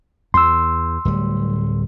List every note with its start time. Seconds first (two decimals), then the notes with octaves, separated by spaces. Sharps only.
0.34 E2 C6 E6
1.05 D1 G3